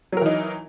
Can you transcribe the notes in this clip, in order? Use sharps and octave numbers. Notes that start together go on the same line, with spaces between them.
E3 F#3 D#4 A#4